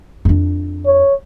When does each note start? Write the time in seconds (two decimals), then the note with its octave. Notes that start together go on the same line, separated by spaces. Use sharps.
0.25 F2 D4
0.86 C#5